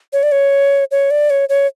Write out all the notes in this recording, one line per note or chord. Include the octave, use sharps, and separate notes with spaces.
C#5
D5
C#5
C#5
D5
C#5
C#5